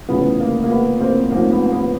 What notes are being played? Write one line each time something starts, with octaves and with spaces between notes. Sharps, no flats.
F1 F2 C#3 E3 B3
A#3
A#3
B3
A#3 C4
A1 G#2 F3 A#3 C4
B3
B3